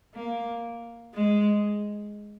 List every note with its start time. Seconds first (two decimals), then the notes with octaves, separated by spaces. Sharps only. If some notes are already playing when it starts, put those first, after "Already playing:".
0.14 A#3
1.14 G#3